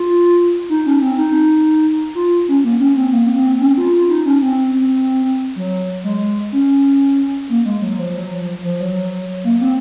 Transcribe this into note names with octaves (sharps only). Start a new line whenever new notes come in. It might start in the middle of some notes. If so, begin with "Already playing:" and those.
Already playing: F4
D#4
C#4
C4
D#4
F4
C#4
A#3
C#4
C4
A#3
C4
C#4
F4
F4
D#4
C#4
C4
F#3
G#3
C#4
A#3
G#3
F#3
F3
F#3
F3
F3
F#3
A#3
C4